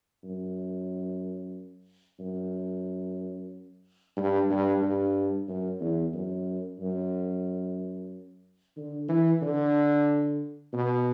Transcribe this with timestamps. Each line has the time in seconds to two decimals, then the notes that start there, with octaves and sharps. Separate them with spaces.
0.24 F#2
2.20 F#2
4.17 G2
4.50 G2
4.82 G2
5.48 F#2
5.81 E2
6.14 F#2
6.80 F#2
8.77 D3
9.09 E3
9.42 D3
10.74 B2